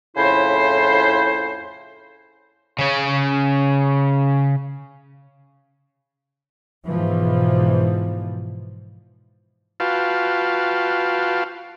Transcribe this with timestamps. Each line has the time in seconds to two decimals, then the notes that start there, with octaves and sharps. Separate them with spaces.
0.17 F2 A2 C#3 E4 C5
2.79 C#3 C#4
6.86 G#2 B2 E3 F3
9.80 F4 F#4 B4 F5 G5 A5